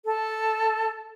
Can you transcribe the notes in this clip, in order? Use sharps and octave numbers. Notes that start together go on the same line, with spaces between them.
A4